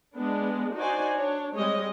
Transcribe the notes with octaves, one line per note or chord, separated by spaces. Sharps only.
G#3 B3 D4
D#4 F#4 C5 D5 G#5
D4 C#5
G3 G#3 C4 C#5 D#5